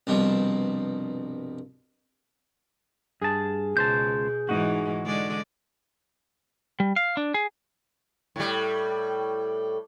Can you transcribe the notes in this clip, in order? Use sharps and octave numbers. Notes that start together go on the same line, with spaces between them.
C2 G2 B2 F3
G2 G#4 A5
C#2 B2 C5 A5 G6
G#2 E3 D#4 F#4
D3 G#3 D5
G3
F5
D4
G#4
A2 G3